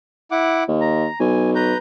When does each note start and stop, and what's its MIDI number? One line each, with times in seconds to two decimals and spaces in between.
0.31 0.64 64
0.31 0.64 78
0.31 0.64 86
0.68 1.06 39
0.81 1.19 82
1.20 1.74 35
1.20 1.50 80
1.55 1.78 71
1.55 1.78 82
1.55 1.78 91